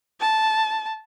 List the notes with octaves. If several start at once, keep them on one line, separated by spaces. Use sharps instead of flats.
A5